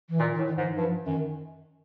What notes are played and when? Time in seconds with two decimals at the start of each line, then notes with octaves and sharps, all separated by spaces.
0.09 E3
0.19 A#2 D#3
0.34 D#3
0.38 A2
0.48 D#3
0.57 G#2
0.62 E3
0.77 G2 F3
1.06 F#2 D#3